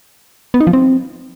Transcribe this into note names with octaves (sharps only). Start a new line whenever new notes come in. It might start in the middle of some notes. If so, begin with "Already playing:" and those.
B3
D#4
F3
C4